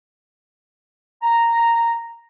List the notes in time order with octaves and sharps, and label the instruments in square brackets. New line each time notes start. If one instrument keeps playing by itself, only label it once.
[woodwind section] A#5